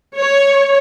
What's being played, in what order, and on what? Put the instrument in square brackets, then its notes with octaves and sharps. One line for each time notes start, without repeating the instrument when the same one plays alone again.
[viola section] C#5